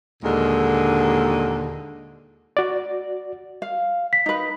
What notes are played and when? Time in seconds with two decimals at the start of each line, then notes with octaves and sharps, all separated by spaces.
0.24 D#2 A#2 D3 G#3
2.57 F#4 D5
3.62 F5
4.13 B6
4.26 D#4 B4